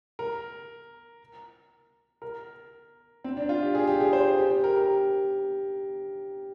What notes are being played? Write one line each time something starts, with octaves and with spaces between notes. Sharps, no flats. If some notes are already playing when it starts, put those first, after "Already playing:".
A#4
A#4
C4
D4
F4
G4
G#4
G4
G#4
C5
G4
G4
A#4
A#4